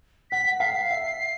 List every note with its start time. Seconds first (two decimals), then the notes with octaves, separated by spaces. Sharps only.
0.31 F#5 B6
0.60 F5 C7
0.91 E5